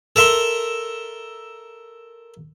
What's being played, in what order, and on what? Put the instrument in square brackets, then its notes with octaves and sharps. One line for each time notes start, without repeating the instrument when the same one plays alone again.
[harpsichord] A4 A#4 E5 C6